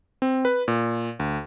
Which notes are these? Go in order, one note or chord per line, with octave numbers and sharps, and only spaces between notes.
C4
B4
A#2
D2